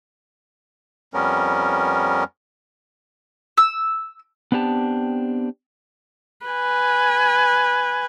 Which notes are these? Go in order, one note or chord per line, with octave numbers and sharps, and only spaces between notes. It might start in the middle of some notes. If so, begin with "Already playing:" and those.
F2 G3 B3 C#4 A#4
E6
B3 C4 D4 G4 A5
B4 G#5